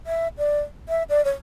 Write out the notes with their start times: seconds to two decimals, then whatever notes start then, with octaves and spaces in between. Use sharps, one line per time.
0.07 E5
0.38 D5
0.89 E5
1.09 D5
1.25 C#5